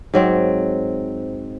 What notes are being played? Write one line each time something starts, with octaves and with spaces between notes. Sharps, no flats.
G#2 F#3 C4